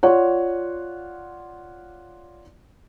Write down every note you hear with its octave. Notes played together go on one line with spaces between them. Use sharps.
F4 C#5 D5 F#5